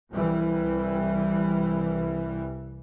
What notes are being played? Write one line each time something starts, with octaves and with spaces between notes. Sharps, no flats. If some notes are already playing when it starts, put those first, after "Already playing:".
C2 E3 G3